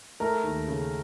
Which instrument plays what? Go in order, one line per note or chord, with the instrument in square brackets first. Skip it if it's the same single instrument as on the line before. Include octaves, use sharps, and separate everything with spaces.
[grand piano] A3 A#4
D#2
C#3